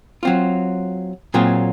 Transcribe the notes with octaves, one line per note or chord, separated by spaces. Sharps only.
F#3 C4 F4
A#2 F#3 C4 F4 G#4